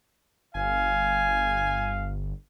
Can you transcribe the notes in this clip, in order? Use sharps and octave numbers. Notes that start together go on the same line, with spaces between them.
G1 F5 G#5